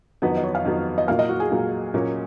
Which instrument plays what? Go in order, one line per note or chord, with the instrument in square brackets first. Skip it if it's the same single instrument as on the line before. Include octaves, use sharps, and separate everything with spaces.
[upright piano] F2 D#3 F#3 B3 [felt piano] B4
[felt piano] D#5
C#5
F5
[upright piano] F2 D#3 F#3 B3
[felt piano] D#5
[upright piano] A#2 F#3 A#3 [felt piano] F5
[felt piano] D#5
F#4
G#4
[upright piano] A#2 F#3 A#3
A#2 F#3 A#3 C#4